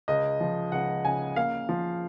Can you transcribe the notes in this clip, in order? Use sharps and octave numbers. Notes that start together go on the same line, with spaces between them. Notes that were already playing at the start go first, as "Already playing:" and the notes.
C#2 D#5
F3
C#2 F#5
C#3 G#5
A#3 F5
F3